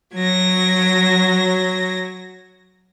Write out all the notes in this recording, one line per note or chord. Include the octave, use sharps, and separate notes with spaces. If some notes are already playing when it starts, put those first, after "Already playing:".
F#3 G#6 A#6